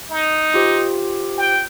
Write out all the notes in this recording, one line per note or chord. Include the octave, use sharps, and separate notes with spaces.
D#4
F4 G4 C5
G5